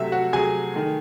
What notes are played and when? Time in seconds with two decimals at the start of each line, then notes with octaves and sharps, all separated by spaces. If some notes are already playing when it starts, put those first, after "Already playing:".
Already playing: C3 F#3 A3 E5
0.12 F#4 F#5
0.33 C3 F#3 A3 G#4 G#5
0.74 D#3 A3